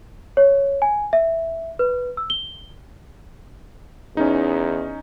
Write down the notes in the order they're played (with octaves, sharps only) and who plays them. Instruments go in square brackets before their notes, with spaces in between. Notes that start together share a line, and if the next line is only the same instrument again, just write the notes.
[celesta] C#5
G#5
E5
B4
E6
G7
[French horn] E2 [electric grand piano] C#4 D#4